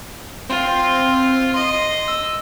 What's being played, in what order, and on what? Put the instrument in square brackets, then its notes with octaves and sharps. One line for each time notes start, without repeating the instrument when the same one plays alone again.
[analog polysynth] C4 [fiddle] F4
[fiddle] D#5 [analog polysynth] C6
[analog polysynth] E6